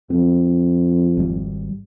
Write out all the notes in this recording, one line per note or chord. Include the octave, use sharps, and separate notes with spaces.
F2 C4
G#1 G3